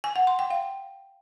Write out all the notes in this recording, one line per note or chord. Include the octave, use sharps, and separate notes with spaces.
G#5
F#5
C6
G5
F5